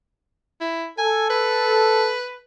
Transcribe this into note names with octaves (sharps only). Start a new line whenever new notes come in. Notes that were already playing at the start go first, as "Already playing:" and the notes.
E4
A4 G#5
B4